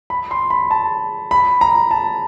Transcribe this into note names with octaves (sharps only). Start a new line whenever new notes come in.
B5
C6
B5
A5
B5
A#5
A5